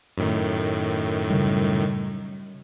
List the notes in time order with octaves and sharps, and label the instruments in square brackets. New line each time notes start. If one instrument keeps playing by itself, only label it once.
[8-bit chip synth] F#2 A2 D#3
[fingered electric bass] C#3 G3